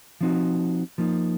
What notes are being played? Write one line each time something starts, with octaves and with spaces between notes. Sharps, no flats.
F3 C4 D#4 F#4
F3 A#3 D#4